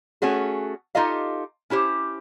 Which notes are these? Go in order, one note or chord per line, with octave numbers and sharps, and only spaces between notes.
A3 C#4 F#4 G#4
D#4 F4 G4 A4 D#5 F5
C#4 E4 G4 C5